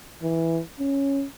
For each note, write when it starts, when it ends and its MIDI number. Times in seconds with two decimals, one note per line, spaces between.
0.23 0.60 52
0.80 1.25 61